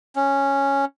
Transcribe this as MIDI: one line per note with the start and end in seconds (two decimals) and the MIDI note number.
0.16 0.85 61